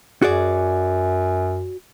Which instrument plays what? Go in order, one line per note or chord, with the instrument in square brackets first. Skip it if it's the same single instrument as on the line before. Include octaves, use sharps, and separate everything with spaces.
[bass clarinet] F#2 [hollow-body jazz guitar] F#4 G#4 D5